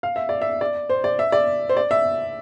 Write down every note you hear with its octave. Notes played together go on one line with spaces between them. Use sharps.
F5
E5
D5
E5
D5
C5
D5
E5
D5
C5
D5
E5